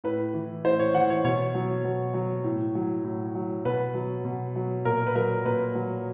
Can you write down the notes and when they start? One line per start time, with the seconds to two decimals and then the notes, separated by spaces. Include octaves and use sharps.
0.04 A2 B4
0.34 E3
0.64 A2 C5
0.79 C#5
0.94 E3 F#5
1.10 C#5
1.24 B2 C#5
1.55 F#3
1.84 B2
2.14 F#3
2.44 A2
2.75 F#3
3.04 A2
3.35 F#3
3.65 B2 B4
3.95 F#3
4.25 B2
4.56 F#3
4.85 A#2 A#4
5.07 B4
5.15 F#3 A#4
5.45 A#2 B4
5.75 F#3